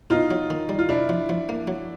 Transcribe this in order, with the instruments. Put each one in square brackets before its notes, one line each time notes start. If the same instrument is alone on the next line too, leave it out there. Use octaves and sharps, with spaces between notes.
[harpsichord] B2 [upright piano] D#4 F4
[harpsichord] F#3
D#3
G3
[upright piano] F4
[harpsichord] C3 [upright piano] D4 E4
[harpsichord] F3
F3
A#3
F#3